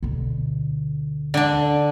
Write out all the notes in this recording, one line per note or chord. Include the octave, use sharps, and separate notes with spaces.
D2 B2
D3 D4